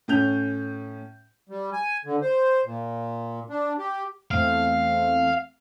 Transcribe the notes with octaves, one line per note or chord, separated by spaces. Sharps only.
A2 C#4 G6 F7
G3
G#5
D3
C5
A#2
D4
G4
E2 A3 C4 F5